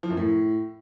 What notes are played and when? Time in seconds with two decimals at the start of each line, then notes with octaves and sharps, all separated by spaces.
0.03 F3
0.10 F#2
0.17 A2